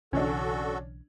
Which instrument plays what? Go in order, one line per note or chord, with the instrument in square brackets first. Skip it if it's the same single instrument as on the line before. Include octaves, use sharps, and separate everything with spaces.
[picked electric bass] B1 C#3 E3 [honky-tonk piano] C#4 D4 [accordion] F#4 A4